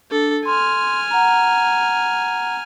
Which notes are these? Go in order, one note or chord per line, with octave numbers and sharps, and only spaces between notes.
D4 A4
G#5 C6 F6
F#5 A#5